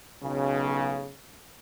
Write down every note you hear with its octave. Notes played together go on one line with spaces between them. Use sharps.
B1 C#3